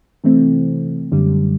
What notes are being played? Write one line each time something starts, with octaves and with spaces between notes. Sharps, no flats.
C3 E3 A3 C4
F#2 D3 G3